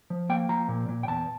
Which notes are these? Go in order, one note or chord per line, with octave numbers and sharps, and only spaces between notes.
F3
A#3 G5
F3 A#5
A#2
A#2
G5
E2 A5